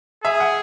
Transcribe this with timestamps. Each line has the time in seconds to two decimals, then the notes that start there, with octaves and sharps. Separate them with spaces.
0.24 G#4 E5
0.40 F#5